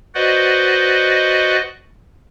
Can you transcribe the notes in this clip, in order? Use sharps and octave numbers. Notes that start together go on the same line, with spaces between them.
F#4 B4 C5 D5 D#5 F#5